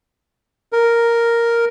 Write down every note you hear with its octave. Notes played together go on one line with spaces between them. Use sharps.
A#4